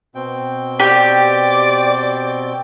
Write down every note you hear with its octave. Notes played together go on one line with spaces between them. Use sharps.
B2 C4 G5
G4 D5